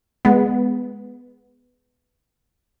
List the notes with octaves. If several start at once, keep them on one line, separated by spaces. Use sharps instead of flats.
G#3 B3